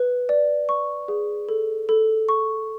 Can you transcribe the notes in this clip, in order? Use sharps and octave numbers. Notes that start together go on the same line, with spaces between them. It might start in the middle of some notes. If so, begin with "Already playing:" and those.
Already playing: B4
D5
C#6
G#4
A4
A4
C#6